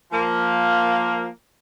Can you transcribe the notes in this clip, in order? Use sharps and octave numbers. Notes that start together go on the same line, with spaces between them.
F3 A#3